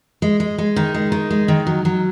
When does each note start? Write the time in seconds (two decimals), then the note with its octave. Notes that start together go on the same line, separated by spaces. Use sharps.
0.22 G#3
0.40 G#3
0.58 G#3
0.76 D#3
0.94 G#3
1.12 D#3
1.31 G#3
1.48 D#3
1.67 F#3
1.85 F#3